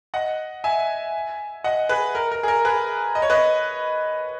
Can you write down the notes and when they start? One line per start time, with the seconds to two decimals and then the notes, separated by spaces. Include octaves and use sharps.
0.14 D#5 F#5
0.64 E5 G#5
1.64 D#5 F#5
1.89 G#4 B4
2.15 A#4
2.31 A#4
2.43 G#4
2.48 A#4
2.65 G#4 B4
3.15 D#5
3.22 C#5
3.30 B4 D#5